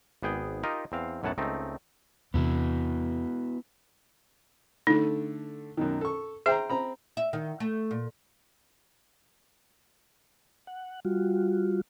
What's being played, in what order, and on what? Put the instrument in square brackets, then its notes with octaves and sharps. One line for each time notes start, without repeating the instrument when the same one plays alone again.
[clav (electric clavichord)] G#1 B3 G#4 G5
D#4 F4 G4 A#4 D#5
E2 C4 F5
B1 F#2 A2 C#5 F#5 A5
C#2 A3 C4 D#4
[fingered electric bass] E2 C3 E3 [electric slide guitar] B3 E4 F#4
[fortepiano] D3 A3 [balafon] D#4
[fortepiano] F#2 B2 D#3
A4 C#6
[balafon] G#4 E5 [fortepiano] C5 G5 A#5
[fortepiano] C4 A#5 B5
[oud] E5
D#3
A3
A#2
[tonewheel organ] F#5
G3 F4 F#4